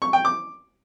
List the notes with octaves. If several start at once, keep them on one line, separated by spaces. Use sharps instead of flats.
C#6
G5
D6